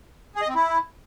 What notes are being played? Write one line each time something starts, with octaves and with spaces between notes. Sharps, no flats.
G#4
D#5
C4
E4